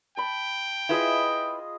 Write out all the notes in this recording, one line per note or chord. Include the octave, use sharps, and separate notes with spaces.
G5 A5 B5
E4 F4 G#4 B4 D#5